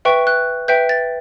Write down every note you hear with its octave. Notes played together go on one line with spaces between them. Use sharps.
B4 E5 G5 C#6
F#6
B4 E5 G5 G6
A6